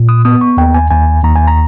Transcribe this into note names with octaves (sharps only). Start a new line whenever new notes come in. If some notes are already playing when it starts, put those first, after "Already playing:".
Already playing: A#2
D#6
B3 D#6
C#6
D#2 G5
G#5
D#2 G#5
D#2 A#5
G#5
A#5